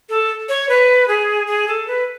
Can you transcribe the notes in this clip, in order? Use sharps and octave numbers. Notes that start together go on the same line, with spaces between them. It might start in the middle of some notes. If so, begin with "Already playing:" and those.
A4
C#5
B4
G#4
G#4
A4
B4